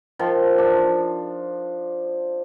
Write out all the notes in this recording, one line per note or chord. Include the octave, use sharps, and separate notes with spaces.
D#3 F3
D4